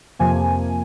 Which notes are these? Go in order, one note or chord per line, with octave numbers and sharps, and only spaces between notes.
F2 C3 F3 A#3 G#5